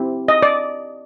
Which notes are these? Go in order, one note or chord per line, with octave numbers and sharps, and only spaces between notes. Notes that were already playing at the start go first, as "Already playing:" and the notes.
Already playing: C4 E4 G4
D#5
D5